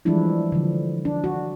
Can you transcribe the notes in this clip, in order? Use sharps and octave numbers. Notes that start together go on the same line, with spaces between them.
E3 F3 G3 G#3 D4 E4
D3 F3
D4
F#4